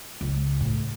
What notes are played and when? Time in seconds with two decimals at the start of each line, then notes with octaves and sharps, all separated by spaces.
0.21 C#2
0.61 A2